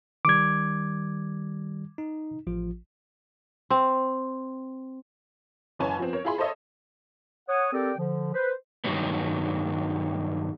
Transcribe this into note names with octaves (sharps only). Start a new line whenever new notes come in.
D#3 G3 D6 G#6
D#4
A1 F3 F4
C4
F#1 E3 C#4 G#5 A5 B5
F3 B3 C4
A#4 C#5
E4 F4 G#4 B5 C6
A4 C5 C#5 D#5 E5
C#5 F#5 D#6
C4 G4 A4 A#4 D5 G5
D3 F3
B4 C5
G2 D#3 F#3 G3 B3